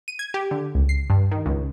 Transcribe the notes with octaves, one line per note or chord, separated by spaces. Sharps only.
D#7
G#6
G4
D3
C#2
C7
G2
D#3
C#2